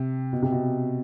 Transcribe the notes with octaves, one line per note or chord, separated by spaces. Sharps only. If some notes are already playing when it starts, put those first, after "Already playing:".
Already playing: C3
B2
C3
B2